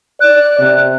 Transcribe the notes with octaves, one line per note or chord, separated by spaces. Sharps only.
D5 F#6
C3